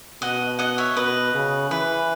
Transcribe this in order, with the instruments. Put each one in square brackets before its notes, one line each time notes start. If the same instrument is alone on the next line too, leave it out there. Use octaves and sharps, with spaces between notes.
[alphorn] B2 [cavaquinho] D#5 F#5
[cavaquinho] D#5 F#5
C#5 E5
[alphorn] B2 [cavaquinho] B4 D#5
[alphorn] C#3
[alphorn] E3 [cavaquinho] B4